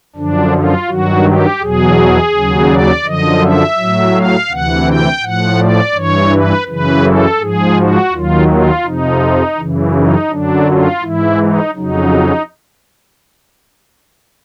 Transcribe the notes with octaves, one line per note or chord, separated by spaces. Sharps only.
F#2 D3 F3 D4
F4
G2 D#3 F#3 F#4
G4
E2 B2 F#3 G#4
D#2 C#3 F#3
D5
F#2 D3 F3 D#5
E5
A2 F#3
F5
D2 C3 E3 F#5
G5
A2 F3 F#5
D5
G2 E3 C#5
B4
F#2 C#3 E3 B4
A4
G#2 F3 G#4
F#4
D#2 D#3 F#3 F4
F4
F2 C3 F3 D#4
F#2 C#3 E3
D#4
F#2 D3 F#3 D4
F4
G#2 E3 E4
D#4
F2 C#3 F#3 D#4